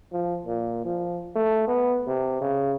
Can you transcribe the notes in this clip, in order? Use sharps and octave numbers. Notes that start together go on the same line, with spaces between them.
F3
A#2
F3
A3
B3
C3
C#3